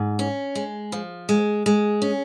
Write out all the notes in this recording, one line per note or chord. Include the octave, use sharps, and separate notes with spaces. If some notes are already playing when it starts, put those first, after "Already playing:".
Already playing: G#2
C#4
G#3
F3
G#3
G#3
C#4